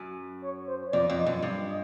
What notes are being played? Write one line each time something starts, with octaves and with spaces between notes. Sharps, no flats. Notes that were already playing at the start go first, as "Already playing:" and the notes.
Already playing: F#2
C#5
C5
C#5
F2 D5
F2
D#5
F#2
G2
D#5